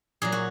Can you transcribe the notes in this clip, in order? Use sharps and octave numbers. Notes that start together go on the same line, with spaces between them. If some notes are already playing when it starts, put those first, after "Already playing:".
A#2 F#3 G#4
F#4